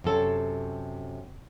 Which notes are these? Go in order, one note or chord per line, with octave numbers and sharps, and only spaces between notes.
F#2 C3 A4 C#5